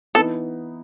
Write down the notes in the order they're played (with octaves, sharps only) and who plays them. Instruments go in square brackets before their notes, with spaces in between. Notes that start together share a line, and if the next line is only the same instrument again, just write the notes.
[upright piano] E3 B3 D#4 [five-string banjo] A4